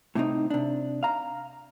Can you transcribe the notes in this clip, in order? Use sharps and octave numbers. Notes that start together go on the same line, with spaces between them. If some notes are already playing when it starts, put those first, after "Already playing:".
A2 C3 C4 D#4
C3 D4
F5 A#5